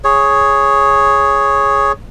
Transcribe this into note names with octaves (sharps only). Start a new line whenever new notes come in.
G#4 C#5